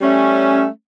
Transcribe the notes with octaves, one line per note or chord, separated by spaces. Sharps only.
G3 A3 C#4